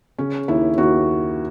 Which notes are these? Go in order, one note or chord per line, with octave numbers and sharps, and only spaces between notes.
C#3 C#4
D#2 E4
D#2 F#4